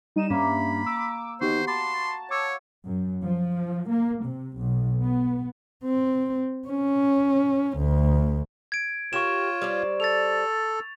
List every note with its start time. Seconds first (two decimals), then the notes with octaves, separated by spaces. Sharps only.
0.16 G3 D#4 D#7 E7
0.30 G2 A#3 C#4 E5 B5
0.86 D6 E6
1.41 D#3 B3 F#4 G4 C5
1.67 A5 B5 C6 D6 A6
2.31 C#5 D6 E6
2.85 F#2
3.25 F3
3.90 A#3
4.24 C3
4.59 B1
5.02 B3
5.84 C4
6.67 C#4
7.78 D2
8.72 G#6 D7
9.13 F4 G4 A#4 C#5 C#6 E7
9.62 G3 C5 D5
10.00 A4 A6 F7